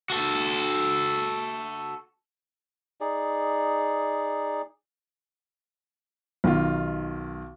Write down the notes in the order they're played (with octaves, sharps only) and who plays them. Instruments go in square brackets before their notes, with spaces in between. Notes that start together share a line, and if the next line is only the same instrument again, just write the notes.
[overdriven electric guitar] F#4 A4
[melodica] D#4 G#4 D5
[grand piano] B1 D#3 F4